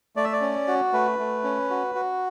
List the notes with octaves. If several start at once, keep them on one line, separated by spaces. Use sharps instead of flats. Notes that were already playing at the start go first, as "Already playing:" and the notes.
A3 D5
E5
D5
C#4
F#4
A3 B4
A3
C#4
F#4
F#4